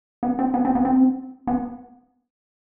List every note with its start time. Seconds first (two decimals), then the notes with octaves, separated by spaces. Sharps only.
0.23 B3
0.39 C4
0.54 B3
0.65 C4
0.75 B3
0.85 C4
1.47 B3